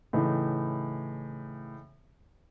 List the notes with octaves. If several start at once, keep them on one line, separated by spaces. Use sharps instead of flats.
A2 C#3 E3 D#4